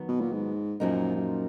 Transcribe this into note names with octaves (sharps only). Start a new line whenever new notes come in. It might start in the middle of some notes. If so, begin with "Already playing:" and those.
Already playing: D#3 F#3 B3
B2
A#2
G#2
F#2 A#2 F3 A#3 D#4
F#2